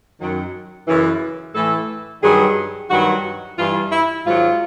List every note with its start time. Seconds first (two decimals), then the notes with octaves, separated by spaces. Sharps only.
0.21 F#2 D#3 F#3
0.88 F#2 C#3 E3
1.55 A2 E3 A4
2.23 G2 D#3 F#3 G#4
2.90 G2 D#3 F#3 F#4
3.59 G2 E3 F4
3.92 E4
4.26 G#2 D#3 F#3 F4